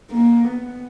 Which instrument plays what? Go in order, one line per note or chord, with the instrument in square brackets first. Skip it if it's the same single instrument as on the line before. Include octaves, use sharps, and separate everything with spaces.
[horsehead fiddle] A#3
B3